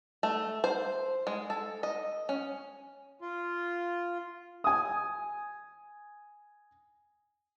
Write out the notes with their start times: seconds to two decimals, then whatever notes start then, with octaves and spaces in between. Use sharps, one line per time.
0.23 A3
0.64 C5
1.27 G#3
1.50 A4
1.83 D#5
2.29 C#4
3.21 F4
4.64 G#5 D#6